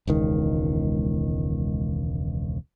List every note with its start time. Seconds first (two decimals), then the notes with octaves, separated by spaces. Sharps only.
0.07 E1 C#2 D#3